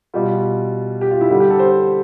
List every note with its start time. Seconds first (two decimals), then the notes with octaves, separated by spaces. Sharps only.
0.14 B2 G3 F4
1.01 G4
1.11 F4
1.21 E4
1.30 D3 G3
1.40 G4
1.50 A4
1.59 C5